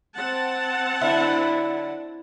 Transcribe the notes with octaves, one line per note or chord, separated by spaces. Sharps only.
C4 F#5 A5
D3 F#3 D4 E4 E5